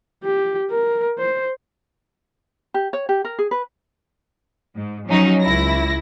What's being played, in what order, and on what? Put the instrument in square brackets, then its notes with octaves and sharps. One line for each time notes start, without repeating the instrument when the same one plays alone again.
[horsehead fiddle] G4
A#4
C5
[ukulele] G4
C#5
G4
A#4
G#4
B4
[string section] G#2
F3 F#3 C#4 D#4
C#2 E4 A#6